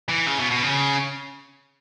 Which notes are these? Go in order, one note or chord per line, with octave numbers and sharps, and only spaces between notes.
E3
C#3
B2
B2
C#3